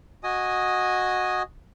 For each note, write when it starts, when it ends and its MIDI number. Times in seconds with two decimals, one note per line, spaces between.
0.24 1.42 66
0.24 1.42 75
0.24 1.42 80
0.24 1.42 87